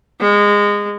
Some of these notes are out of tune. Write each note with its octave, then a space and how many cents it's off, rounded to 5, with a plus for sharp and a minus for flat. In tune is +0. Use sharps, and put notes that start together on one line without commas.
G#3 -20